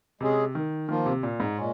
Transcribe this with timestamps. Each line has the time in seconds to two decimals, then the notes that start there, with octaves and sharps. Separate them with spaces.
0.21 C3 G#3 C#4 G#4
0.55 D#3
0.89 D#3 F3 A#3 F4
1.06 C3
1.23 A#2
1.40 G#2
1.57 A#2 G#3 C#4